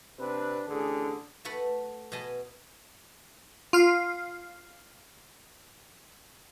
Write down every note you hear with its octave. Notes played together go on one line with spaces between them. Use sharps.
C3 C4 D4 B4
A1 D3 G#4
A3 F#4 A4 B4 F#5
B2 G#4 D#5 A5 B5
F4 F5